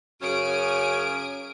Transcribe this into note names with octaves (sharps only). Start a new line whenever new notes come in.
F#2 C#3 C#4 G#5 D#6 D7